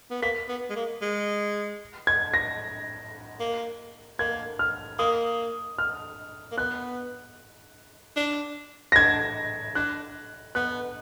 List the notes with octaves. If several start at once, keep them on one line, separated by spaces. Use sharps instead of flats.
B3
A#3 B6
B3
G#3
A#3
G#3
G#6
A#6
A#3
A#3 G#6
F6
A#3 D#6
F6
A#3
B3 F#6
D4
A#6
D4 G#6
D4 F#6
B3 F#6